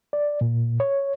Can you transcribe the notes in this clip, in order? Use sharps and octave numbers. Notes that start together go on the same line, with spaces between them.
D5
A#2
C#5